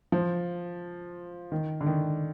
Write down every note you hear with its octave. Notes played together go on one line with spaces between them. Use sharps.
F3
D#3
D3
D#3